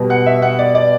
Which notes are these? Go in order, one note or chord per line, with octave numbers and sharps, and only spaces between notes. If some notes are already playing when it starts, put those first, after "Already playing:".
Already playing: B2 G3 B3
F#5
E5
F#5
D5
D5